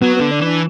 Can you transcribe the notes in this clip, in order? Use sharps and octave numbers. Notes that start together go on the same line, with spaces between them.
F#3 B3
D3 B3
D4
E3
D4